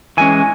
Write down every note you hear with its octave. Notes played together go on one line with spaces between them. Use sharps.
E3 G#3 C#4 G#5